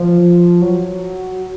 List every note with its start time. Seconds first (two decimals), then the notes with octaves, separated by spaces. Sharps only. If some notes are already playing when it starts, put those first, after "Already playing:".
Already playing: F3
0.62 F#3